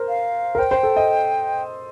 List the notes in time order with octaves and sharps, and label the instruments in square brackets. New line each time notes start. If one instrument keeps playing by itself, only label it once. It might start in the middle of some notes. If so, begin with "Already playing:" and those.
Already playing: [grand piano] A#4 C5
[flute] F5
[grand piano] A#4
[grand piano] C5 [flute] G5
[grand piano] C5
A4
D#5